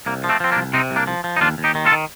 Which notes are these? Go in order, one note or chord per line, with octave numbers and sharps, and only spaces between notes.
C2 A#3
F3
A3 C4
F3 C4
A#3 D4
C2
C3 C4 D#4
C2
A#3 D4
F3
F3
D#4
D#2 D4 F4
D#2
D#4 G4
D#3
F4 A4
D#3